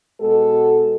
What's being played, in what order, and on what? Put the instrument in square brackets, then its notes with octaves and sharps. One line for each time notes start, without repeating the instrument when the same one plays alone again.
[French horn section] B2 G#3 F#4 A4